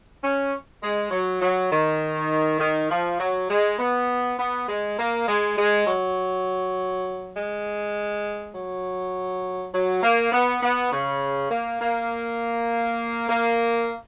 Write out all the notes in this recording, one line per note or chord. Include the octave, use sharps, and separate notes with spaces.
C#4
G#3
F#3
F#3
D#3
D#3
F3
F#3
G#3
B3
B3
G#3
A#3
G#3
G#3
F#3
G#3
F#3
F#3
A#3
B3
B3
C#3
A#3
A#3
A#3